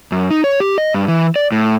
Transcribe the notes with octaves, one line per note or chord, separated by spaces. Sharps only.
F#2
D#4
C#5
G4
D#5
G2
E3
D5
A2